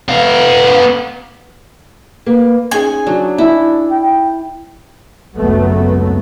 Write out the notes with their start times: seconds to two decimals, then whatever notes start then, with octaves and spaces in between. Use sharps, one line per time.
0.08 B3 F5
2.26 A#3 B4
2.71 C#4 D#4 G#4 G#5
3.07 F#3 D4
3.38 E4
3.91 G5
5.36 G#1 C#2 F#2 F#3 A3 B3